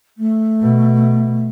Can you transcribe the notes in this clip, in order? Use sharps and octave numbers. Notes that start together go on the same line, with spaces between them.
A3
B2